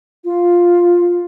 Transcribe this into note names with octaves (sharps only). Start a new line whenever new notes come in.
F4